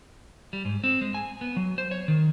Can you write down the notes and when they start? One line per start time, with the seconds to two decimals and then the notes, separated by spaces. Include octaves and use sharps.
0.53 G3
0.65 G#2
0.84 C4
1.01 G#3
1.14 G#5
1.41 B3
1.56 F#3
1.78 C5
1.91 C#5
2.08 D#3